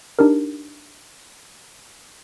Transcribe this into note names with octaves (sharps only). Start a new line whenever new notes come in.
D4 D#4 G4 A#4